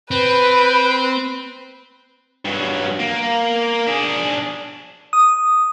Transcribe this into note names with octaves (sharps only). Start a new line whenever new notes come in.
C4 B4
G2 F#3
A#3
D4 G#4
D#6